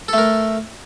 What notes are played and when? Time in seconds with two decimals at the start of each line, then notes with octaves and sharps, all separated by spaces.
0.08 A4
0.13 A3
0.18 A#4